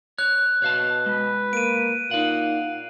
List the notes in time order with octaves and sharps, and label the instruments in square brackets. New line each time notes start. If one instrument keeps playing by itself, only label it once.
[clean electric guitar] C#5 [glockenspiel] F#6
[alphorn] B2 [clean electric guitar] C#5 F5 A5
[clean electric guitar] G#3 [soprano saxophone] B4
[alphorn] A#3 [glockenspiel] D7 D#7
[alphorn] A#2 [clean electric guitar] D#4 F#5 [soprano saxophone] F5